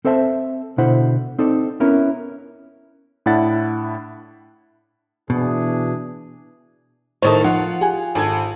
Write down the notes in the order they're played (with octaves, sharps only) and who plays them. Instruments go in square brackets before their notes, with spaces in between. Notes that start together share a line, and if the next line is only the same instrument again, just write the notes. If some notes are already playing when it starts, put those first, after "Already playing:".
[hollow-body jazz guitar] C4 A4 C5 E5 A5
B2 D3 E4 C5 F#5
C4 D#4 A4 D5
B3 C#4 E4 A#4
[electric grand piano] A2 D4 E4 F#5 A6
[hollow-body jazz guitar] B2 [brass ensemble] E3 D4 G#4
[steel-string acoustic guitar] A2 D#3 A4 [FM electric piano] C5 A6 [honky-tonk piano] C#5 D#5 D#6
[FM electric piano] F3 D#4 [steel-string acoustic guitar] F4 [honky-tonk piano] F#5
[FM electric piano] G4 G#4 G#5
[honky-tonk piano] G#1 A4 G#6